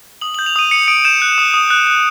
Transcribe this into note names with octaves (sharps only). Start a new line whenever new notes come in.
D#6 F#7
F#7
G6
F7
D#6 D#7
D#6 C#7
D#6 D7
G6 E7
F#6
D#6
D#6
F#6
F#6